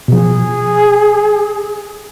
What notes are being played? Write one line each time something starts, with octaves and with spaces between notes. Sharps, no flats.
B2 F3 G#4